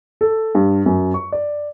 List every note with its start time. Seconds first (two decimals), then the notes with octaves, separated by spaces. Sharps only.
0.21 A4
0.55 G2
0.86 F#2
1.14 C#6
1.32 D5